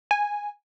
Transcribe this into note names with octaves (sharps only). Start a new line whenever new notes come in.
G#5